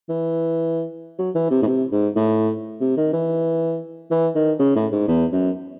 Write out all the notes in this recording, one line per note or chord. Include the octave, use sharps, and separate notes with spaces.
E3
F#3
E3
C3
A2
C3
G#2
A2
C3
D#3
E3
E3
D#3
C#3
A2
G#2
E2
F#2